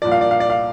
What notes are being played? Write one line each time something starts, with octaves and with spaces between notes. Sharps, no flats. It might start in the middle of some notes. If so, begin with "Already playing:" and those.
C2 A#2 F3 D5
F5
D5
F5
D5
F5